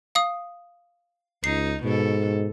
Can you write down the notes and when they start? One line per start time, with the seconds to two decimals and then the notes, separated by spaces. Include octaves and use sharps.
0.15 F5 D#6
1.44 C#2 D#4 C7
1.83 G#2 B2 A4